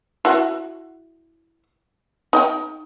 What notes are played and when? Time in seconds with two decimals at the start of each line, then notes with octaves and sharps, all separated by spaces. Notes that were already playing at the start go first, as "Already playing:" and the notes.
0.25 E4 F#4 F#5
2.33 D#4 D#5 G5